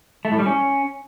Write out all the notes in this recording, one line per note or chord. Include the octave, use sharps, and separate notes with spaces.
A3
A2
G3
C#4